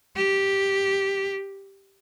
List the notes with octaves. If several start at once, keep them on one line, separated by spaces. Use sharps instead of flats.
G4